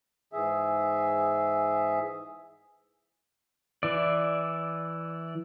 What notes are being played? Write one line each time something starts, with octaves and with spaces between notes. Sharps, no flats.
G#2 E3 G#4 E5
E3 D5